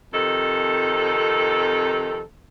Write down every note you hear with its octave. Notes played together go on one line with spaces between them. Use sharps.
F2 C3 D#3 A4